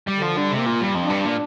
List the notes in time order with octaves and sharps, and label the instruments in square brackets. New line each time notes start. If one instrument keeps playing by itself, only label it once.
[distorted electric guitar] G3
[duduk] D3
[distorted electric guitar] F3
[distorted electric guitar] D3 [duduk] G3
[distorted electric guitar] C3
[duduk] A#3
[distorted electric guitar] A#2
G2
F2
[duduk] D4
[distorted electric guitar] G2
A#2